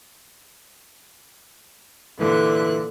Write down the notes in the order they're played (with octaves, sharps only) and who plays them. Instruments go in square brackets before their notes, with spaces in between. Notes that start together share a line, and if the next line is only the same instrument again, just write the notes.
[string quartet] A#2 D3 F#6 [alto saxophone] E3